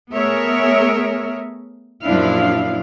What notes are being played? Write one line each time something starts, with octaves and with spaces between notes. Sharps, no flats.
A3 B3 G#4 A#4 C#5 E5
F#2 A#2 F3 D4 E4 F5